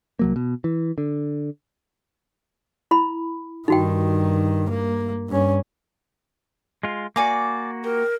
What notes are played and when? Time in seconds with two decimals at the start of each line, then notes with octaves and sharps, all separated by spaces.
0.19 C2 F#3 A#3
0.36 B2
0.64 E3
0.98 D3
2.91 E4 B5
3.68 G2 D#3 D#4 F#4 G5
4.70 A#3
5.29 G2 C#4
6.83 G#3 F4
7.16 A#3 F#4 D5 G#5 D6
7.84 G4 A#4